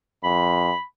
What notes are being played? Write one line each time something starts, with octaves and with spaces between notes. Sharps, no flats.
F2 B5